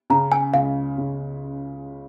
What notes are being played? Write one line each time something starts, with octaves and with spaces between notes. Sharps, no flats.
C#3 A#5
G#5
C#2 F5
C#3